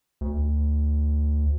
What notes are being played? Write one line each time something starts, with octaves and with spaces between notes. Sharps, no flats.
D2